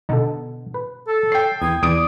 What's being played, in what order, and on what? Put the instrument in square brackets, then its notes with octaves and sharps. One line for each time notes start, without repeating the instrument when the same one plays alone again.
[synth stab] B2 D3 [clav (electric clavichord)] D#4 A4
[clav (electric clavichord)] B4
[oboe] A4
[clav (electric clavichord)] C#5 [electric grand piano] G5 C7
[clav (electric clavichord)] E2 [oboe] D#6 [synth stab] G#6
[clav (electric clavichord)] E2 [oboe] D5 [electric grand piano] D#6 D7